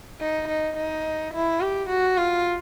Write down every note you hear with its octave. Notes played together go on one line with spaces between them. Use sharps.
D#4
D#4
D#4
E4
G4
F#4
F4